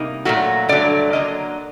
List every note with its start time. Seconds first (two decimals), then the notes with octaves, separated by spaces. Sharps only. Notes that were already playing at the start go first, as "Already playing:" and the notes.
Already playing: C3 G3 A#3 D#4
0.25 A#2 F#3 A3 F#4
0.69 G2 D3 F#3 A3 D5
1.13 D3 F#3 A#3 D4 D#5